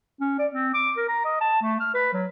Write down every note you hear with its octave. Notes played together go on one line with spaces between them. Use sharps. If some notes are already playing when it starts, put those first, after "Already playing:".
C#4
D5
C4
D6
A#4
A#5
D#5
A5
A3
F6
B4
F#3